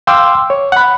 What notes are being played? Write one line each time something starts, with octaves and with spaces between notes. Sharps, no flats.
F5 G5 C6 D6 E6
C#5
F#5 B5